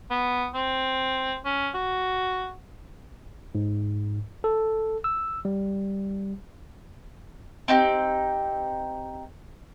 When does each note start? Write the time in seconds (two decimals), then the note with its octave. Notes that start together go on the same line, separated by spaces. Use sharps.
0.11 B3
0.54 C4
1.45 C#4
1.74 F#4
3.55 G#2
4.44 A4
5.04 E6
5.45 G3
7.68 C4 D#4 G4